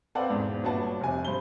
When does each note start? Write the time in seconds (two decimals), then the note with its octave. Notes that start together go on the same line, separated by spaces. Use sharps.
0.15 C4 A4 B4 D5 F5 F#5
0.30 E2 G#2 B2
0.63 G1 A#2 D4 F#4 B4 A5
1.01 F1 C3 G#5
1.25 G2 C5 G7